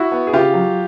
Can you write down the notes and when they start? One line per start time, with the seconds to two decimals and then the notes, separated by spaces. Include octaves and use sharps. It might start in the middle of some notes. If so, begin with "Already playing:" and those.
Already playing: E4 F#4
0.12 B3
0.27 G#4
0.33 C#3 F4 G4
0.54 F#3